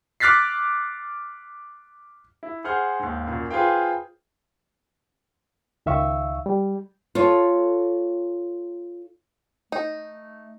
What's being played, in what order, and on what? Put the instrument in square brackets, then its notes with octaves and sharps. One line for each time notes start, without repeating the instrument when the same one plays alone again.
[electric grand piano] D6 F6 F#6 A6 B6 C7
[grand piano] E4
G#4 C5 F#5 F6 G6
D#2 G#2
F#2 A#2
F4 G#4 B4 C5 F5 G5
[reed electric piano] C#2 D#3 E5 F5 C#6 E6
G3
[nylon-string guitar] F4 A4 C#5
[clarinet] A3 [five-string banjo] D#4